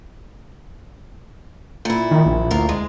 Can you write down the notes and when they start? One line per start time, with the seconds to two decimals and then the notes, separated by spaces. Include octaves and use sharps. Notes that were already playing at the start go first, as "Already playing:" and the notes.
1.85 A#2 E4
2.11 D#3
2.26 A#1
2.51 D2 F4 A#4
2.69 G#3